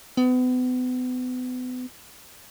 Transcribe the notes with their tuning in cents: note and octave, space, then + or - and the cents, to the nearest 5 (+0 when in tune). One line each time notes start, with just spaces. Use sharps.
B3 +35